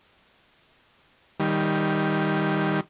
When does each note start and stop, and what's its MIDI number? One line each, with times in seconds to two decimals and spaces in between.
1.40 2.80 51
1.40 2.80 55